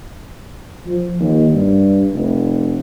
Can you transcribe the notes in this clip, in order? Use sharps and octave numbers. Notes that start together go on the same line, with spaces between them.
F3
D#2
G2
F1